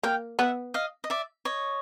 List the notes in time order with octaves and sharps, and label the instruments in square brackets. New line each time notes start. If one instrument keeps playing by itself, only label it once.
[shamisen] A#3 [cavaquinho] F5 G5
[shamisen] B3 [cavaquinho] E5 F#5
[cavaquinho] D#5 F5
D#5
D5 E5
C#5 D#5